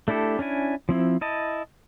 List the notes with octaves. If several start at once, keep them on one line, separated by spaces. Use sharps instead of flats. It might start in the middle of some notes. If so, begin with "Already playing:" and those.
A3 D4 E4 G4 A4
C#4 D4 E4 G#5
F3 C4 E4
E4 D#5 A5